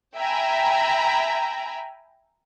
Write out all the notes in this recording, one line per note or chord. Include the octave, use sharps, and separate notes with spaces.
E5 G5 G#5 A#5 B5